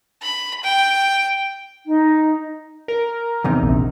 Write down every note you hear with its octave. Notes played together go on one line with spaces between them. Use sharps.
B5
G5
D#4
A#4
E2 C3 D#4
A#1